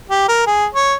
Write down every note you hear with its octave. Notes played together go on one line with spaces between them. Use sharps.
G4
A#4
G#4
C#5